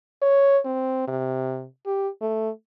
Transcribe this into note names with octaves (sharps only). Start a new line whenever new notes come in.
C#5
C4
C3
G4
A3